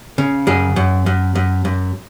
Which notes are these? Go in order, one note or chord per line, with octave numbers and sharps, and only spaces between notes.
C#3
F#2 G#4
F#2
F#2
F#2
F#2